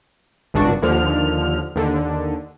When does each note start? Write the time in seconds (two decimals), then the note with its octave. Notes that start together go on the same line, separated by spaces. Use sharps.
0.54 G#1 C#2 G2 D4 F#4
0.82 D#2 D3 F3 F6
1.76 D#2 D3